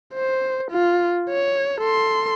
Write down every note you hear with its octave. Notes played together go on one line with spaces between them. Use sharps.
C5
F4
C#5
A4 C6